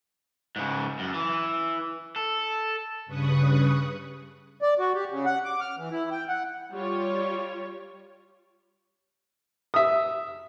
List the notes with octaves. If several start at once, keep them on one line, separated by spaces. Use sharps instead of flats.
G#2 C#3
F#2
E3
A4
G2 C#3 B4 C#6 D#6 F#6
D5
F#4
G4
C#3
F#5
D6
F6
E3
E4
G5
F#5
G3 F4 C#5
E5 D#6